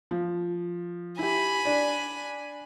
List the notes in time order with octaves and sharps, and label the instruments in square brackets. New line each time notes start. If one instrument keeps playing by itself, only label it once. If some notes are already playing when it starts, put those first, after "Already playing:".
[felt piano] F3
[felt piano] E4 G4 [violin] G#5 B5
[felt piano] D4 D5